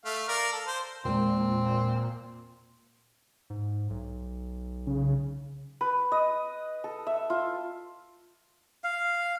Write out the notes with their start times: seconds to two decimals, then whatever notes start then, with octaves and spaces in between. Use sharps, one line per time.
0.05 A3 F5
0.28 A#4 D5 F5
0.52 A4
0.67 C5
1.05 E1 A#2 G#3 C4
3.50 G#2
3.90 B1
4.87 C#3
5.81 B4
6.12 D#5
6.84 A4
7.07 E5
7.30 F4
8.84 F5